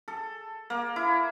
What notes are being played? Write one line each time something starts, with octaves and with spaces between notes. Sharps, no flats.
A4
A#3
E4